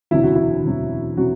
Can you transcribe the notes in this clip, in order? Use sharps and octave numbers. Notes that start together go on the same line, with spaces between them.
E1 D2 C3 F#3 E4
F#4
E4
E1 D2 C3 F#3
C3 F#3 F#4